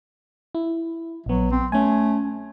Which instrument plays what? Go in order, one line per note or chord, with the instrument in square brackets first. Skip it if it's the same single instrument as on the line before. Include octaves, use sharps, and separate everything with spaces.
[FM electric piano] E4
[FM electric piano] A#1 B3 [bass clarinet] F#3
[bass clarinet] C4
[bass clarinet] A3 [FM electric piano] C#4 G#5